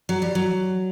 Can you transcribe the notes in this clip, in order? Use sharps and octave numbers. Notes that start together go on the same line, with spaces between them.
F#3
G3
F#3